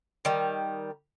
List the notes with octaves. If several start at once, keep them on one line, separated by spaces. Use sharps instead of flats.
D#3 G3